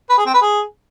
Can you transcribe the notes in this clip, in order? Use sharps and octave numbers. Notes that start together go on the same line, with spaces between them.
B4
G#4
C4
B4
G#4